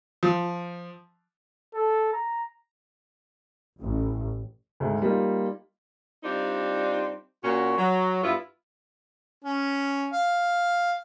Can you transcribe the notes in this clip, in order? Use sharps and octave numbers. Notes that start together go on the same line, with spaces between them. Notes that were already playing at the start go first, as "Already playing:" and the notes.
F3
A4
A#5
A1
D2 G#2
G3 A#3 D#4 F4
G3 C4 D4 D#4 F4
A#2 C#4 F#4
F#3
G2 B3 E4 F4
C#4
F5